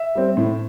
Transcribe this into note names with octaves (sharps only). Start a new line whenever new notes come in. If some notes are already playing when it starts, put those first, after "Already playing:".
Already playing: E5
G3 C4
A2